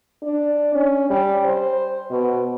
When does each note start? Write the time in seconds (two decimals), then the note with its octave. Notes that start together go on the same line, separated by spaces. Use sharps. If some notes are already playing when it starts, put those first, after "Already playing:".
0.22 D4
0.75 C#4
1.10 G3
1.45 C5
2.11 B2